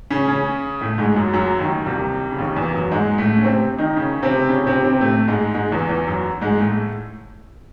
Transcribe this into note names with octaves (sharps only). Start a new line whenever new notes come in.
C#3 C#4
C#3 C#4
A2 A3
G#2 G#3
F#2 F#3
F#2 F#3
D#2 D#3
C2 C3
C#3
D#2 D#3
E2 E3
F#2 F#3
G#2 G#3
A2 A3
C#4
C3 C4
D#3 D#4
C#3 C#4
C3 C4
C#3 C#4
C3 C4
C3 C4
A2 A3
G#2 G#3
G#2 G#3
E2 E3
E2 E3
F#2 F#3
G#2 G#3
A2 A3